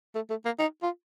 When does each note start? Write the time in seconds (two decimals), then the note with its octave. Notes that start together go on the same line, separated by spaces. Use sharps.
0.15 A3
0.30 A3
0.45 A#3
0.59 D#4
0.83 F4